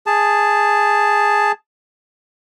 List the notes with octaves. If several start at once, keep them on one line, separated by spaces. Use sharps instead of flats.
G#4 A5